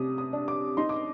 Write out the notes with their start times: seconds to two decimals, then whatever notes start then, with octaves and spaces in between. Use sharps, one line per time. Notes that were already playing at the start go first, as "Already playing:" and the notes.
Already playing: C3 G3 D6 D#6
0.18 D#6
0.33 D4
0.48 D6
0.77 D#4 C6
0.89 D6